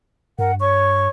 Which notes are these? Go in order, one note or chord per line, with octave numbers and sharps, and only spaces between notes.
G2 A#4 F#5
C#5 C#6